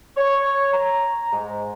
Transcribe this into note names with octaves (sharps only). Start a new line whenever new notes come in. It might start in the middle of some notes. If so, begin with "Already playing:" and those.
C#5
A#5
G#2